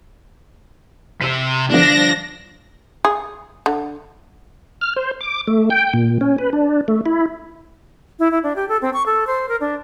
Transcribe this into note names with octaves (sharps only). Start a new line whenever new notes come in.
C3 E6 B6
G2 D3 F3 D4 A#6
G#4
D3
F6
C5
D6
A3
G5
A#2
C#4
B4
D4
A3
E4
E4
E4
D4
G4
A4
C4
C#6
A4
C5
A#4
D4